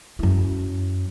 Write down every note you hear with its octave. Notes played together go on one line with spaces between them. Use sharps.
F#2 E4